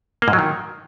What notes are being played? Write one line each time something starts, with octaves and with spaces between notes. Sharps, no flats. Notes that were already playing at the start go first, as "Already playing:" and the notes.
A#3
G#2
F#3
D#3